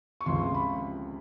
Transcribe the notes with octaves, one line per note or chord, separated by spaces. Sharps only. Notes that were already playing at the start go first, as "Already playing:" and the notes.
C#6
C#2 C3 F3 C6
B5